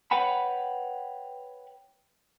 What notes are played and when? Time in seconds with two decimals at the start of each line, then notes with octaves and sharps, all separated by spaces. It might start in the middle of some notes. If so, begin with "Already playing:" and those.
0.11 B4 C#5 F#5 G5 B5